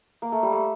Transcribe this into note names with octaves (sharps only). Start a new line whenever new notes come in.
A#3
A3
G3
A3